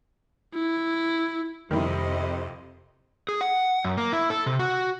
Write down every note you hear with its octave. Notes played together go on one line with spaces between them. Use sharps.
E4
F2 C3 D#3 G3 E4 D#5
G#4
F#5
F#2
A#3
E4
A4
C3
F#4